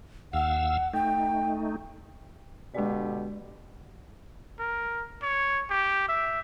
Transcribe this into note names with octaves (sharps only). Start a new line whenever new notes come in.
D#2 F5 F#5 E6
A3 D#4 G5
B2 D3 G#3 G4 D5
A#4
C#5
G4
E5